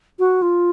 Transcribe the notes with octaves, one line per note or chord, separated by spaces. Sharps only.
F#4
F4